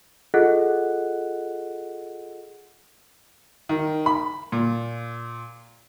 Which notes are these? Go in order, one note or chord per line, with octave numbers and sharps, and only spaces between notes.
F4 G#4 A4 D#5 F#5 F#6
D#3
B5
A#2